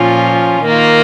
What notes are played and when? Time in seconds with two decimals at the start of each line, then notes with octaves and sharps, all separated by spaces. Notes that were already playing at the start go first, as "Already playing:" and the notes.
Already playing: A#2 F3 C#4 F4
0.65 D#3 A#3 F4